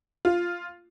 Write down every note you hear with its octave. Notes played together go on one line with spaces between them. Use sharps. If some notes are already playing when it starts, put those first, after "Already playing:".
F4